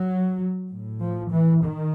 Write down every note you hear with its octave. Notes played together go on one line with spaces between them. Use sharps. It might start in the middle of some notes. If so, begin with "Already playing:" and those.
Already playing: F#3
A2
F3
E3
D#3